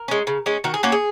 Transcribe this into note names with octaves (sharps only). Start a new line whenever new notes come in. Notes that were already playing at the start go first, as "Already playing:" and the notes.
Already playing: A#4
G#3 C#4
C#3
G#3 C#4
D#3 F#4
G#4
A#3 C#4 F#4
G#4